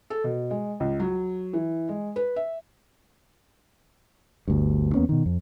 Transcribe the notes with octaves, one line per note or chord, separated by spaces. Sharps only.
A4
B2
G#3
C#2
F#3
E3
G#3
B4
E5
G1 D2 G2
E2 A#3 B3 C#4
B2 D#3
F2